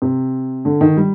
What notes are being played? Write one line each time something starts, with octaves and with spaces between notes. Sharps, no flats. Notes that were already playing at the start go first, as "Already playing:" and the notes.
C3
D3
D#3
G3